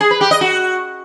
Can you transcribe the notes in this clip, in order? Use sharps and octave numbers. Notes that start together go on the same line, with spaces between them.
G#4
B4
G4
D#5
F#4